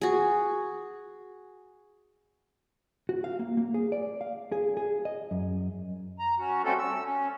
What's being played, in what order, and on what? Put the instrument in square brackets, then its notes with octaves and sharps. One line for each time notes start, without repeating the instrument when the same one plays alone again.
[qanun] F#4 G#4
[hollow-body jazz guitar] F#4
F5
A#3
A#3
G#4
D5
F5
G#4
G#4
D#5
F#2
[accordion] A#5
C#4 F#4
G3 A3 C4 C#4 F#4 A4
E6
C#4